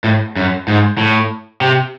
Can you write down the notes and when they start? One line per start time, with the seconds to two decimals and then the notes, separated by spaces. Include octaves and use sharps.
0.04 A2
0.36 F#2
0.68 G#2
0.98 A2
1.61 C3